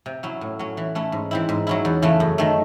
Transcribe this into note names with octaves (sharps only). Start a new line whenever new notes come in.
C3
F#3 C#4 E4
A2
F#3 C#4
E3
A3 C#4 E4
G#2
E3 C4 E4
G#2
F#3 C#4 E4
E2
C#3 E3 A3 C#4
F#2
D#3 A3